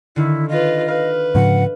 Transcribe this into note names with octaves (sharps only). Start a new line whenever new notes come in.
D3 D#3 E4
F4 B4 D#5
B4 F5
G#2 C#3 F3 F#5